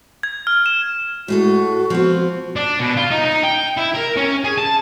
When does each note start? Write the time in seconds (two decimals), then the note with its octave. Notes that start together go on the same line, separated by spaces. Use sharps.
0.23 G#6
0.47 F6
0.66 E7
1.28 A2 G#3 F#4 A4
1.90 F3 B3 C4
2.56 D4
2.80 B2
2.97 F4
3.11 D#4
3.25 D#4
3.44 G5
3.77 E4
3.94 A#4
4.16 C#4
4.44 G#4
4.58 A5